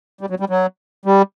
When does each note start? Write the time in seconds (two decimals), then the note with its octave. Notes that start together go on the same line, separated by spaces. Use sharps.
0.21 G3
0.30 F#3
0.40 G3
0.50 F#3
1.05 G3